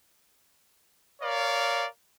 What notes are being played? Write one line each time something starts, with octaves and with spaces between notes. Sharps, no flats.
A#4 C#5 D5 F5